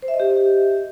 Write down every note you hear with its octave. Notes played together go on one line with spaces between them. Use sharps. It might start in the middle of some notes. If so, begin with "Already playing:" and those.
C5
E5
D#5
G4